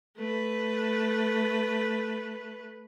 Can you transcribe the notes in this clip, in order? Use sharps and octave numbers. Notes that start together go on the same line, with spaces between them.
A3 B4